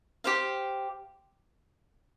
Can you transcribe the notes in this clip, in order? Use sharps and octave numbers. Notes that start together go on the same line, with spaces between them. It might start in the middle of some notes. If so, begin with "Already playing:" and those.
G4 C5 F5